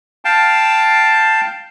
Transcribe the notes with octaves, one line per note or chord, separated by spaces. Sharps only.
F5 G5 A5